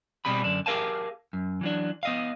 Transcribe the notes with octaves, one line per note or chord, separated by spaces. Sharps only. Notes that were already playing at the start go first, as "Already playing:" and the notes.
B2 G3 C4 G#4 B5
F#2 D3 D4
G4 G#4 A#4 F5 G#5 A5
F#2
E3 F#3 D4
B3 D#5 F5